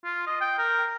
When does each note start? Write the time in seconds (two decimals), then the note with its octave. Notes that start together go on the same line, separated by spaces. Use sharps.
0.04 F4
0.27 D#5
0.41 G5
0.59 A#4